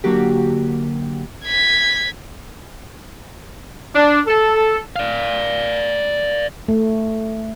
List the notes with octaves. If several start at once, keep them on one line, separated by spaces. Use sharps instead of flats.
D3 F#3 A#3 F#4 G4
G#6 B6
D4
A4
D5 F5
A3